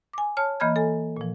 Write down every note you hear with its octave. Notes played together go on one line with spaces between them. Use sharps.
G#5 D6
C#5 A5 F6
E3 A#3 D#5 B5 F6 G#6
A4 G#5
A#2 F3